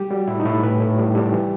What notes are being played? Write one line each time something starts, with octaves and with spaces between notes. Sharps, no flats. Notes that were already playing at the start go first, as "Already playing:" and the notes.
Already playing: G3 G4
G3 F#4
A2 E4
D#4
A2 E4
A2 B4
A2
G3
G3
E3